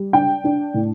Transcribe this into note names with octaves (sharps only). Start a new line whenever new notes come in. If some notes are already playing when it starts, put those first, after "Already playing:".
Already playing: G3
D4 G5
D4
A2